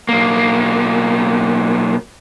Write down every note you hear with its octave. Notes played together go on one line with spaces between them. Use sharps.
B1 A#3